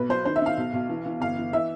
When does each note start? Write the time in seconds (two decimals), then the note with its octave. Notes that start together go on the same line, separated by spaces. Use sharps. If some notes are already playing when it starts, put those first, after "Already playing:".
Already playing: B1 B4
0.09 F#3 C5
0.25 D#3 C5
0.36 E5
0.42 D#3 F5
0.57 B1
0.73 B1
0.89 E3
1.06 E3
1.20 G1 F5
1.37 E3
1.53 E3 E5